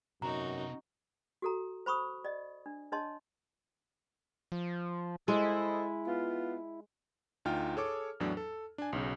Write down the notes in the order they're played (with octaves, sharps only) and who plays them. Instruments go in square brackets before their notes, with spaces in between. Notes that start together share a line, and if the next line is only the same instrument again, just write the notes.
[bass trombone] F#2 [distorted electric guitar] C3 B3 [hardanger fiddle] D#4 F#4 [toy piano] A#5
[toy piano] F#4 A4 A#5
C5 B5 C#6 D#6
D5 D#5
D4
D4 C#5 D#5 A5 C6
[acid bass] F3
[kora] G#3 [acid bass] E4 [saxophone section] A4 C5 D#5
[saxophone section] B3 F4
[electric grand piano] D2 D#4 F4 G5 F6
G#4 A4 C#5 D6
E2 A2 F#3 D4
A4
D4 G#5
B1 C#3